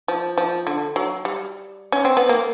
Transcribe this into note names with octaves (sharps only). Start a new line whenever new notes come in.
F3
F3
D3
F#3
G3
C#4
C4
B3
A#3